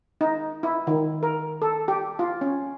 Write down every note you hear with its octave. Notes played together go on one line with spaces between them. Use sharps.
D#4
E4
D#3
A#4
A4
G4
F4
C#4